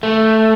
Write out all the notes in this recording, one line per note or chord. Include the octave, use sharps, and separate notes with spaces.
A3